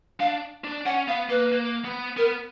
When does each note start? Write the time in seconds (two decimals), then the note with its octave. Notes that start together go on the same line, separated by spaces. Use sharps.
0.20 D4 F5
0.64 D4
0.85 C#4 F#5
1.08 B3 F5
1.29 A#3 B4
1.52 A#3
1.85 B3
2.17 B3 A#4